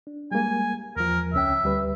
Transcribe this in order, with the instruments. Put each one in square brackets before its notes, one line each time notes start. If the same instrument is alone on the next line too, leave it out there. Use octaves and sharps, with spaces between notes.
[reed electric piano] D4
[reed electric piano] G3 G#3 A#3 [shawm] G#5
[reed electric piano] E2 F3 [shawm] A#4
[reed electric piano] C#2 C#4 G5 [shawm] E5
[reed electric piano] D2 G3 B4